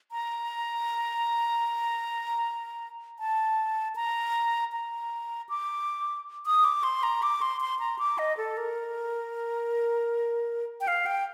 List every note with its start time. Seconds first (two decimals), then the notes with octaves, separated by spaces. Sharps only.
0.12 A#5
3.19 A5
3.96 A#5
4.73 A#5
5.49 D6
6.46 D#6
6.64 D6
6.83 C6
7.03 A#5
7.22 D6
7.42 C6
7.61 C6
7.79 A#5
7.99 D6
8.18 D#5
8.37 A4
8.57 A#4
10.81 G5
10.88 F5
11.06 G5